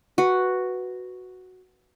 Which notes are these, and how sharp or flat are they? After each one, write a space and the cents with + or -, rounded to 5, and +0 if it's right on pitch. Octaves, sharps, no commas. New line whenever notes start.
F#4 +0 B4 +0